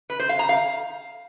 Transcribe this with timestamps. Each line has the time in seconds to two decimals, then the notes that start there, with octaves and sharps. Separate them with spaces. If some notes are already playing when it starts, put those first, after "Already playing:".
0.10 B4
0.20 C5
0.29 F5
0.39 A#5
0.49 F5